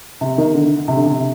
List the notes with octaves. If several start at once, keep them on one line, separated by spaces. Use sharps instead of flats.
C3
D#3
D3
C3
D3
C3